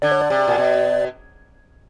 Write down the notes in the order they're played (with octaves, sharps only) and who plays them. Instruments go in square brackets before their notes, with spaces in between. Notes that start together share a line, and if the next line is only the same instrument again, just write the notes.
[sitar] D3 [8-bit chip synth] D5
[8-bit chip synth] C#5
D5
[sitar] C3
A#2
B2